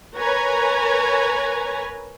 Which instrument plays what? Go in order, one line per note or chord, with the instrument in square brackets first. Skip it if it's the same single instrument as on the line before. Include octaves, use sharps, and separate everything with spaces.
[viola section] A#4 B4 C#5 G#5 A#5